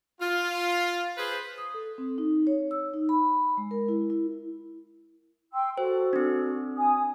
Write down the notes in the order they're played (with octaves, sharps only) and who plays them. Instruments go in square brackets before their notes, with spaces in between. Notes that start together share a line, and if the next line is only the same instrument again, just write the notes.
[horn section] F4
G#4 B4 C5
[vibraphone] D#6
A4
C4
D#4
C#5
E6
D#4
B5
G#3
A#4
E4
E4
[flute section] G5 C6 E6
[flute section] F#4 A4 [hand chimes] C5
[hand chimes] C4 D4
[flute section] G#5 D#6